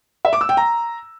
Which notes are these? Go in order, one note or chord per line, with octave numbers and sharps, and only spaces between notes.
E5
D6
E6
G5
A#5